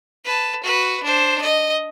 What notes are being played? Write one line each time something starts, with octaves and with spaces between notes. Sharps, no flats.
B4 A5
F#4 B4
D4 C5
D#5